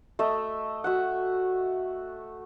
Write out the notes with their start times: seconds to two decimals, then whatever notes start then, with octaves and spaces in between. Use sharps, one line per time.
0.19 A3 D#5 E5
0.84 F#4 E5 F#5